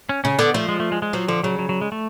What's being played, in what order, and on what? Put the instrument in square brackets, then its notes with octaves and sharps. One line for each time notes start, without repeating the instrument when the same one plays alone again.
[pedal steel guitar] C#4
[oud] C#3 [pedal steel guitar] C#4
[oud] D3 [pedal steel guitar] B3
[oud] F3 [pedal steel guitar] A3
[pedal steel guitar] G#3
A3
G#3
G#3
[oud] F3 [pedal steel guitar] F#3
[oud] D3 [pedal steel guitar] F3
[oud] C#3 [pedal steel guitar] F#3
[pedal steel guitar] F#3
F#3
G#3
A3